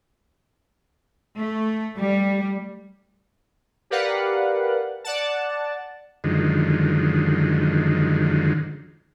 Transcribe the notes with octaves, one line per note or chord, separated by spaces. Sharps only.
A3
G3
G4 A#4 B4 D5 F5 F#5
D5 F#5 A5
F#2 D3 D#3 F3 G#3